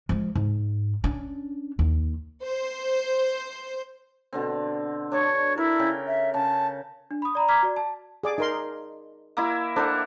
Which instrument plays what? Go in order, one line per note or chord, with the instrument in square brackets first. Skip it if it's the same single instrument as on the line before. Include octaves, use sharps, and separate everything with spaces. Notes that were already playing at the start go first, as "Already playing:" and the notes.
[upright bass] F3 G#3
G#2
C#4 D4
D#2
[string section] C5
[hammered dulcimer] B2 D3 C4
[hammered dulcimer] D4 A5 C#6 [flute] C#5
[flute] E4 [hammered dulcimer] A#4
[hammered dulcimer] C#3 G5
[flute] E5
[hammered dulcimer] C#3 [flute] A5
[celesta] D4
B5 D#6
D5 A#5 B5
A#5 D6 F6 G#6 B6
F#4 D5
A5
[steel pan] G#4 D5 D6
D#4 A#4 C6
[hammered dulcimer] A#3 E4 E5
[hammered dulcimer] D4 A#4 F#5 [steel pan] A4 C5